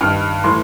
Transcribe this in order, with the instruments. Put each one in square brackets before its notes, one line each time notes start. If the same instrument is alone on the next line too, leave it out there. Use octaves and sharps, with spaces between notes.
[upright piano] G2 D#3 F6
A2 E3 C6